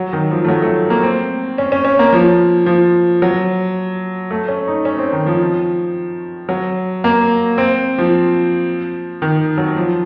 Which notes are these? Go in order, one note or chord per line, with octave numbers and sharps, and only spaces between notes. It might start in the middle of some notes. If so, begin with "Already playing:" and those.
Already playing: F#3
D#3
F3
A3
F#3
A3
A#3
C4
C#4
C#4
C#4
A#3
F3
F3
F#3
A3
C#4
D#4
C#4
C4
D#3
F3
F#3
A#3
C4
F3
D#3
F#3
F3